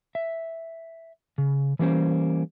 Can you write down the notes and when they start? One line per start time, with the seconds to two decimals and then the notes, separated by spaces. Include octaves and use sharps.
0.15 E5
1.38 C#3
1.79 E3 G3 A#3 C#4 C5